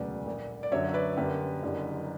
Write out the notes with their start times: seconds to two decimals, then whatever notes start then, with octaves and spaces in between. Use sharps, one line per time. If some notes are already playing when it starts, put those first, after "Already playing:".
Already playing: E1 D2 C#3 F#3 B4 D5
0.26 A#1 A#2 A#3
0.63 D5
0.72 F#2 D3 F#3 C#5 E5
0.89 E5
0.94 B4 D5
1.17 F#2 D3 G3 A#3 G4 B4
1.63 F#1 F#2 D3 G3